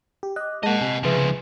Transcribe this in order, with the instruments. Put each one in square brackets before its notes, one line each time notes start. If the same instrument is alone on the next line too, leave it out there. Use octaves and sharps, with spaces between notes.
[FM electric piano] G4
[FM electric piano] D#5 [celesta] D6 F#6
[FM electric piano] G#3 A#3 [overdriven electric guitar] D#5 F#5 [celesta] A5
[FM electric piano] C3 [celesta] G#5
[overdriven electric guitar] C#3 F3 [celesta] G#4 B4 E5